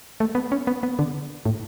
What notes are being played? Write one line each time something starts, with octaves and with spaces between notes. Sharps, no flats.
A3
B3
C#4
B3
B3
D3
A2